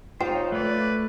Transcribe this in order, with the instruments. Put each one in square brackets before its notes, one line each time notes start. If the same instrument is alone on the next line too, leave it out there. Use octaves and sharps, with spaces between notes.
[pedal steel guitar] D#4 C5 [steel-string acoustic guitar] F4 C#5 [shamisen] G5
[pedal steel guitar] A3 D5 [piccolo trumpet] B4